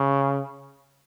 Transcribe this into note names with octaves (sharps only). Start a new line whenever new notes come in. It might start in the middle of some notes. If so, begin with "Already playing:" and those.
Already playing: C#3